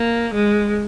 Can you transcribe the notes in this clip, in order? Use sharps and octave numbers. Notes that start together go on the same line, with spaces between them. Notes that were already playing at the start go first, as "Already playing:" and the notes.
Already playing: A#3
G#3